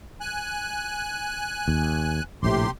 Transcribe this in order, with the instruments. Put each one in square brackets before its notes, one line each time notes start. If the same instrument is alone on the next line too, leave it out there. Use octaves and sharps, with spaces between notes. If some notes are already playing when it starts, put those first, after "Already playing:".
[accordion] G#5 F#6
[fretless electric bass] D#2
[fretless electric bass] A#1 A2 [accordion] C3 G4 C6